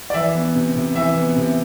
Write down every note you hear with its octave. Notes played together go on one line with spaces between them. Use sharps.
D5
E3 E5
B3
C3
C3
E3 E5
B3
C3